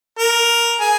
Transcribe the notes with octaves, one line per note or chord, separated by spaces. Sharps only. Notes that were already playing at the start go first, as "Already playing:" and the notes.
A#4
G#4